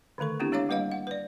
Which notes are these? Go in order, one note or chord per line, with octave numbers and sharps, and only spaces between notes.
D3 D#3 A3 A4 C#6
B3 C4 D4 E4 G4
G#3 D4 C#5 E5 F5 D6
G3 A#3 B4 D#5 F5
F#5
B4 D5